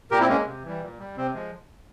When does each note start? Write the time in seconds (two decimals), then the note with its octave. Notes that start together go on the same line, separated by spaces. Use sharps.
0.11 A#2 G4 A#4
0.20 C4 E4
0.28 G#3 A#3 C#4
0.46 C3
0.64 E3 G3
0.81 A#2
0.99 G3
1.16 C3 C4
1.34 F3 G#3